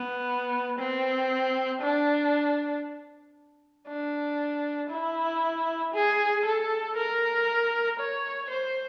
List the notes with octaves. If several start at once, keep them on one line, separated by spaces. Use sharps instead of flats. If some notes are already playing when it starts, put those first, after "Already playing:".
Already playing: B3
C4
D4
D4
E4
G#4
A4
A#4
C#5
C5